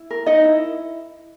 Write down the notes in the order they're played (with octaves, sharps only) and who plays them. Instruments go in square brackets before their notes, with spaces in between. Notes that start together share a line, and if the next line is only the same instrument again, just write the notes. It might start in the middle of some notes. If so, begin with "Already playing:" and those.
Already playing: [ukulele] E4
A#4
D#4 D#5
E4